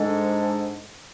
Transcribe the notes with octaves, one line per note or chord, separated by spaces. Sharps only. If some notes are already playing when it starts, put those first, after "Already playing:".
Already playing: G#2 G#3 D4 A4